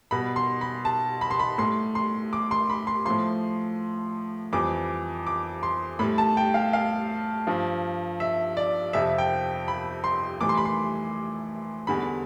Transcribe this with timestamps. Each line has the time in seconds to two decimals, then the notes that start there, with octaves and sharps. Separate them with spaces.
0.11 B2 G3 B5
0.36 C6
0.61 B5
0.85 A5
1.21 B5
1.31 C6
1.39 B5
1.58 A2 G3 C6
1.95 C6
2.33 D6
2.51 C6
2.70 B5
2.87 C6
3.05 A2 F3 C6
4.52 F2 E3 G3 D6
5.27 D6
5.63 C6
5.99 A2 G3 B5
6.18 A5
6.37 G5
6.54 F5
6.73 F5
7.47 G2 F3
8.20 E5
8.57 D5
8.93 F2 C3 F3 E5
9.18 G5
9.68 B5
10.04 C6
10.41 A2 E3 G3 D6
10.49 C6
10.57 B5
10.65 C6
11.87 E2 D3 G3 B5